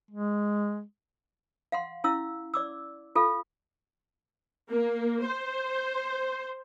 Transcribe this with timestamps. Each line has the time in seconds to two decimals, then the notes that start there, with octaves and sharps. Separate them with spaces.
0.11 G#3
1.72 F5 F#5 C6
2.04 C#4 E4 F5 E6
2.54 D5 D6 E6
3.15 F4 A4 F5
4.71 A#3
5.25 C5